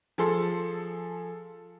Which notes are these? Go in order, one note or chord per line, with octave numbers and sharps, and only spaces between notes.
F3 G#4 A4 C6